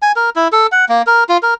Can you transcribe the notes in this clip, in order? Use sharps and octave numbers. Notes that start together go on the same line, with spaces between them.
G#5
A#4
E4
A4
F#5
A#3
A#4
F4
A#4